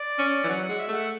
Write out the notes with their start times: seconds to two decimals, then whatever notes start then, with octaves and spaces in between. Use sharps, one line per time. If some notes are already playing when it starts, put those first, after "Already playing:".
Already playing: D5
0.19 C#4
0.44 E3
0.49 F#3 F#5
0.63 F#5
0.69 G#3
0.79 E5
0.88 A3 F#5